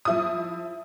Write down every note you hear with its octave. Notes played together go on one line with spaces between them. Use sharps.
F3 E4 D#6